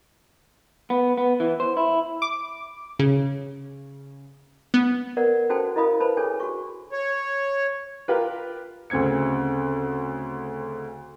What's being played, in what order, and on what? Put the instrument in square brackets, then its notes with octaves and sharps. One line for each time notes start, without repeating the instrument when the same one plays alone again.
[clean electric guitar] B3
B3
E3
C5
E4
[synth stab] D6
C#3
B3
[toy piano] A#4 B4 D5 F#5
C#4 F#4 A4 C5 G5 A5
E4 A#4 D#5 F5 B5 D#6
B4 C5 A5 B5
D4 G#4 A4 C#5 G#5
F#4 C#6
[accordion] C#5
[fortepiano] F4 G4 A#4 B4
[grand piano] D2 C#3 C4 G#6 C#7